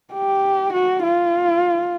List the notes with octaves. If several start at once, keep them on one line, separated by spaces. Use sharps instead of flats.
G4
F#4
F4